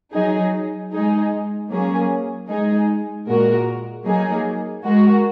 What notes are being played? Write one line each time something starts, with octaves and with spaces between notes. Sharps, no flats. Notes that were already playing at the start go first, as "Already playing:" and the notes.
F#3 D#4 G#4
G#3 D#4 G#4
F#3 A#3 C#4 G#4
G#3 D#4 G#4
A#2 G#3 F#4 A#4
F#3 A#3 D#4 G#4
G#3 F#4 A#4